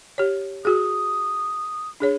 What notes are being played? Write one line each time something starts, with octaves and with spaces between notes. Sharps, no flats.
G4 C#5
F#4 G#4 D#6
D4 G#4 C#5